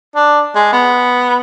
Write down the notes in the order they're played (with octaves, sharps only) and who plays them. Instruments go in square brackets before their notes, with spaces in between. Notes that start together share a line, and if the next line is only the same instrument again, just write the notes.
[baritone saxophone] D4
G#3
B3